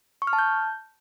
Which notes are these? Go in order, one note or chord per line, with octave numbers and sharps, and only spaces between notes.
C#6
F6
A5
G6